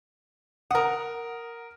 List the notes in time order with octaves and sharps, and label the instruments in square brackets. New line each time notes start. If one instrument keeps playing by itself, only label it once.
[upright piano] A#4 D#6 [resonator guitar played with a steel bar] F#5 A#5